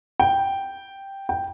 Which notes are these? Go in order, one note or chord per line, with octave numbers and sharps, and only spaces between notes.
G5
G5